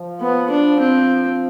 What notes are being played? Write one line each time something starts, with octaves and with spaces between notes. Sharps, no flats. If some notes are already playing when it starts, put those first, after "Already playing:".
Already playing: F3
B3
D4
C4